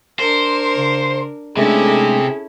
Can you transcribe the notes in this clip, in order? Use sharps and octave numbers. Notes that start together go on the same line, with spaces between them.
D4 A#4 C5
C#3
C3 G#3 A3 C#4 D4 E4 G#4 A4